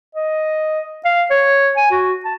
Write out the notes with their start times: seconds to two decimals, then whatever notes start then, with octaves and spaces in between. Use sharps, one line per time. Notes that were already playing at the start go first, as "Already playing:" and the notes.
0.15 D#5
1.05 F5
1.30 C#5
1.77 G#5
1.91 F#4
2.25 A5